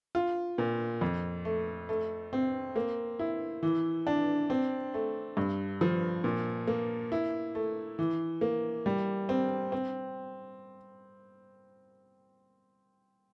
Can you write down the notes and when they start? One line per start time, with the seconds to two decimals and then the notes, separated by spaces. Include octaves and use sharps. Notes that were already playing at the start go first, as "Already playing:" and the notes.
0.15 F4
0.58 A#2
1.01 F2
1.45 A3
1.89 A3
2.33 C4
2.76 A#3
3.19 E4
3.63 E3
4.07 D4
4.50 C4
4.94 A3
5.37 G2
5.81 F3
6.24 A#2
6.67 A#3
7.12 E4
7.55 A3
7.99 E3
8.41 A#3
8.86 G3
9.29 C4
9.72 C4